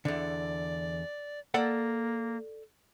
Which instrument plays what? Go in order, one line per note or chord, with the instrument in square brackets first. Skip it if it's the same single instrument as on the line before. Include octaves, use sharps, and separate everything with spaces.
[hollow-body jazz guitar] E2 D3 [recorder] D5
[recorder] A#3 [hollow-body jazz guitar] A4 D5 F#5